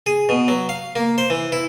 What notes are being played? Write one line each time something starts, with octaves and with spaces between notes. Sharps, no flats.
G#4
B2
F#3
F5
A#3
C5
E3
E4